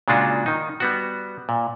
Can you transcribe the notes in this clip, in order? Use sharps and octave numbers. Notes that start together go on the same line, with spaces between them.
A#2 C#3 G#3 D4 F4 F#4
D#3 D#4
G3 B3 F#4
A#2